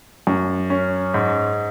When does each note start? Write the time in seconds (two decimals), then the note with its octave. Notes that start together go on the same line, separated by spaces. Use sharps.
0.27 F#2
0.70 C#4
1.14 G#2